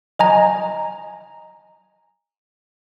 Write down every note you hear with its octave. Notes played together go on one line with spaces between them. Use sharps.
D#5 G#5 A#5